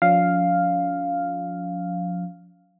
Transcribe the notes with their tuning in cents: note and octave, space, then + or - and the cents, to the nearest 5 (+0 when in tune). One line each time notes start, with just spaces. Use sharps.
F3 +35 C#4 +45 F5 +0